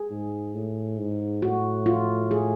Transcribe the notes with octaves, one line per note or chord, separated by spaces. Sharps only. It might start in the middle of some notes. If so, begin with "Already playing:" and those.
Already playing: G#4
G#2
A2
G#2
A2 F#4
F4
G#4